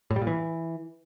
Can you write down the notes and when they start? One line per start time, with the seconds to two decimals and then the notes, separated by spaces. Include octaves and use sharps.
0.11 A2
0.16 G3
0.22 A#2
0.27 E3